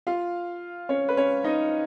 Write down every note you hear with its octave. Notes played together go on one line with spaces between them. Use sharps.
F4 F5
C#4 C#5
B4
C#4 C#5
D#4 D#5